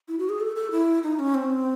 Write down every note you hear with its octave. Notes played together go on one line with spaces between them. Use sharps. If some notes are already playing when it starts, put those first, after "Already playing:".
E4
F#4
G#4
A4
A4
E4
D#4
C#4
C4